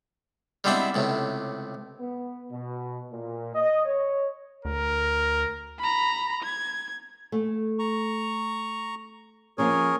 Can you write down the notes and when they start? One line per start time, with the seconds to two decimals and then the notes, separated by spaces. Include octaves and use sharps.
0.64 G3 G#3 B3 C4 D4 E4
0.94 C#2 A2 C3
2.00 B3
2.51 B2
3.12 A#2
3.55 D#5
3.86 C#5
4.65 D2 A#4
5.79 A#5 B5
6.42 G#6
7.32 A3
7.79 A#5 C#6
9.58 F3 A#3 C#4 G#4 A#4 C#5